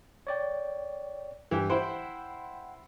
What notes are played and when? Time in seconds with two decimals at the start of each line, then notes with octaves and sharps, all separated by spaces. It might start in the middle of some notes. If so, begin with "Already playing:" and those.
0.27 C#5 D5 G5
1.51 G2 E3 G4
1.70 E4 C5 F#5 G5 B5